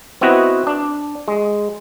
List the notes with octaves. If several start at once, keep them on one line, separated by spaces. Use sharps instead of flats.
B3 C4 E4 F#4 B4 D#5
D4
G#3